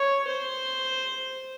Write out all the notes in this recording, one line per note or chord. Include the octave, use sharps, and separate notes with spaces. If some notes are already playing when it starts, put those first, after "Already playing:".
Already playing: C#5
C5